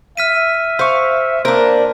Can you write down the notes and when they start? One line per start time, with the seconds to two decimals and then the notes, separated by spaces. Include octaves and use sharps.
0.17 E5 F6 B6 D#7
0.79 C5 F5 C#6
1.45 A#3 D4 A#4 C5